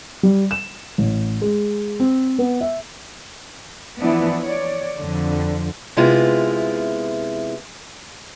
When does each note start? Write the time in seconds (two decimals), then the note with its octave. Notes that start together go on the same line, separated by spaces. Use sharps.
0.23 G3
0.51 E7
0.98 A1
1.42 G#3
2.00 C4
2.39 B3
2.61 E5
4.00 E3 F3 B3 D4 E4 D5
4.42 C#5 D5
5.00 F2 D3
5.97 C3 G#3 B3 E4 F4